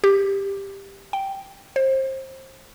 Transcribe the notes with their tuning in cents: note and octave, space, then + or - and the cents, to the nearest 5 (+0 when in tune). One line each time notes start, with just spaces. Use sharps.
G4 +10
G5 -5
C5 +25